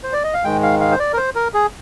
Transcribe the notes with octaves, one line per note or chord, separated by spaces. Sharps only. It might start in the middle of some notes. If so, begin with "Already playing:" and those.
C5
D5
D#5
F5
G#2 D#3 G#3 G5
F5
F5
C5
D5
A#4
C5
A#4
G#4